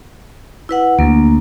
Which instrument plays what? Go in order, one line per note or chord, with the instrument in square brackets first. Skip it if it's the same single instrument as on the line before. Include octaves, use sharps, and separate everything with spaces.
[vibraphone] E4 B4 F#5
[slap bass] D2 [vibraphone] A#3